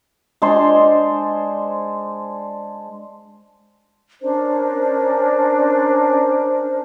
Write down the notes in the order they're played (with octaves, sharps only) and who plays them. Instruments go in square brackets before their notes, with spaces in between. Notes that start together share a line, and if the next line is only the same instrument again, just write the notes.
[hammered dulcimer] G#3 D4 C5 C6
[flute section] C#4 D4 A#4 C5